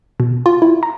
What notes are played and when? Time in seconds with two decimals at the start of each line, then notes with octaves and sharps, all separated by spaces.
0.20 B2
0.46 F4
0.62 E4
0.83 A#5